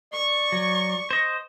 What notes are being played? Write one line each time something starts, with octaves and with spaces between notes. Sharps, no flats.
D5 C#6
F#3
C5 D#5